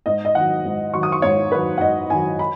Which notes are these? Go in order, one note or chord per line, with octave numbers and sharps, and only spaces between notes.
G#2 D#5
D#5
D#3 F#3 F#5
G#2
D#3 F#3 C#6
D#6
C#6
G#2 C#5
D#3 F#3 B4
F#5
G#2 D#5
D#3 F#3 G#5
B5